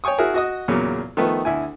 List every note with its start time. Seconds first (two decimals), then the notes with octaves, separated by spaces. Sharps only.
0.04 C#5 G5 G#5 C#6 D#6
0.18 E4 F#4 G#4 A#4
0.34 F#4 D#5 D#6
0.68 E2 A#2 C#3 F#3
1.17 D#3 F3 A3 B3
1.45 D2 E4 G#5